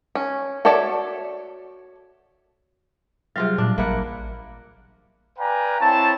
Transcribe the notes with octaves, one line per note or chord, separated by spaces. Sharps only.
C#4
F#4 A4 C#5 D5 E5
C3 F#3 G3 F4 G#4 F5
A#2 D4
A1 A#3 E4 F#5
B4 D5 F5 G5 G#5 A#5
C4 E4 C#5 A5